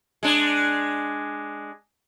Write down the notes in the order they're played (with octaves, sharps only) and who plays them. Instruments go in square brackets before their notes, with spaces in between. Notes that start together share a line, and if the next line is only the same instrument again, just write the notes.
[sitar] G#3 D4